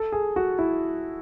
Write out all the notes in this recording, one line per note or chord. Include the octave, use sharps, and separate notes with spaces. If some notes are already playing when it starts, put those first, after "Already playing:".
Already playing: A4
G#4
F#4
E4